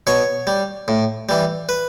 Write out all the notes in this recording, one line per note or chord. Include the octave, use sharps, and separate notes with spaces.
B2 C#5
G3
A2
E3 G3
B4